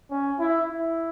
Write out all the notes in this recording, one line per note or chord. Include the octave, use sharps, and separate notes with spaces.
C#4
E4
E4